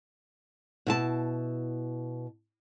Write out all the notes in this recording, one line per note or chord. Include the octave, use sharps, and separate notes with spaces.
B2 E4 A5